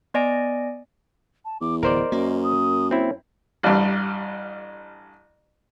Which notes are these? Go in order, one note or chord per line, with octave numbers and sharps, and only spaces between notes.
B3 D5 D#5 G#5 D7
A5
E2 D6
D1 A#4 C5 D5 D#5
F#2 A#3
D#6
C4 E4 C#5
A1 G2